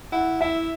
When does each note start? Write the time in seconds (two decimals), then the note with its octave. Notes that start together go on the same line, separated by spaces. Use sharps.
0.12 E4 F#5
0.41 E4 E5